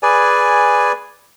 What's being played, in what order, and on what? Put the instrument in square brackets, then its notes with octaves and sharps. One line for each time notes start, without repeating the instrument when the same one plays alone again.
[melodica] G#4 B4 D5 G#5